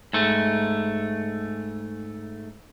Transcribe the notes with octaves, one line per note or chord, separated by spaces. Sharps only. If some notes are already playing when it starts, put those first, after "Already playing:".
G#2 A3